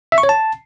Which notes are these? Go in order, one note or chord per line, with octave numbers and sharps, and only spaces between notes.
E5
C#6
C#5
A5